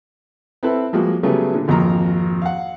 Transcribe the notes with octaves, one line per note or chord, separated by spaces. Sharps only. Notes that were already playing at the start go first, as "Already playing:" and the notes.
C4 E4 A4 B4
F3 G3 G#3 A#3 F#4
C#3 F#3 G3 A3 B3 G#4
A#2 D3
G#1 F2 A#3 A#5
F5 F#5